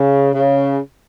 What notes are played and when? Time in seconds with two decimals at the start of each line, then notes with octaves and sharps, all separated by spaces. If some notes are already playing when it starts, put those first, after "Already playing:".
Already playing: C#3
0.34 C#3